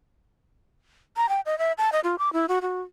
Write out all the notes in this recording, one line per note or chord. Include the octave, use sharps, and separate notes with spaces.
A#5
G5
D#5
E5
A5
D#5
F4
D6
E4
F#4
F#4